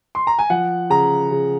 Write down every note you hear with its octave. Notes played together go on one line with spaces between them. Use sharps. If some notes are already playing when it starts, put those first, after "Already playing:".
C6
A#5
G#5
F3 F#5
C#3 A#5
C#3